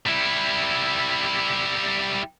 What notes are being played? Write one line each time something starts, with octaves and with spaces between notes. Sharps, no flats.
G3 E4